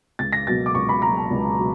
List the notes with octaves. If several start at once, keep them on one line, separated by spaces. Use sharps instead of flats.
C#2 A6
A#6
B2 F#3 A#3 A6
D6
C#2 C#6
B5
B2 F#3 A#3 A#5
A5
C#2
B2 F#3